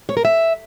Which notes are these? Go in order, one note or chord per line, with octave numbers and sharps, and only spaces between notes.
C#5
A#4
E5